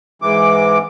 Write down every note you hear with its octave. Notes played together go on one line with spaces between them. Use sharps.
G#2 E3 D6